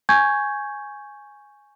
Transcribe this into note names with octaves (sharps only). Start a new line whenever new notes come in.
G#5 C#6 G6 G#6